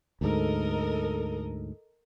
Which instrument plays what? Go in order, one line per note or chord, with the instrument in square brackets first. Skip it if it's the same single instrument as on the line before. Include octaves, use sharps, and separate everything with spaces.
[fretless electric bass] D2 G#2 [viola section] A4 A#4 D#5